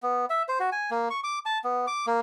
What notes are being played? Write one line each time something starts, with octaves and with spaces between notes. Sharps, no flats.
B3
E5
C5
F#4
G#5
A#3
C#6
D6
A5
B3
D6
A#3